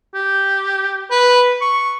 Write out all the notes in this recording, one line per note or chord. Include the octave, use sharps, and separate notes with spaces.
G4
B4
C#6